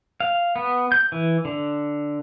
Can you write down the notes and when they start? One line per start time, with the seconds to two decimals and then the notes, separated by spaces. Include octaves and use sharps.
0.20 F5
0.56 B3
0.92 G6
1.12 E3
1.45 D3